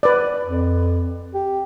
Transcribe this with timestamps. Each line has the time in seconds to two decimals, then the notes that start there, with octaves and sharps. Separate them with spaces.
0.03 B4 D5
0.44 F2
1.34 G4